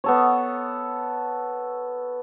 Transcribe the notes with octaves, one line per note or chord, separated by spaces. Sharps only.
B3 A4 C#5